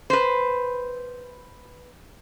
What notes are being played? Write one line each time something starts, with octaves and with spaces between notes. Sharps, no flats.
B4 C5